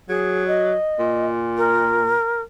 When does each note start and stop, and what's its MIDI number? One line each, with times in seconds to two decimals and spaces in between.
0.09 0.74 54
0.09 0.47 68
0.48 1.27 75
0.99 2.17 46
1.58 2.41 70